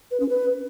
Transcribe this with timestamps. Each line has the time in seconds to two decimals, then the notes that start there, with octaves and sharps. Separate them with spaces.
0.11 B4
0.20 C#4
0.29 B4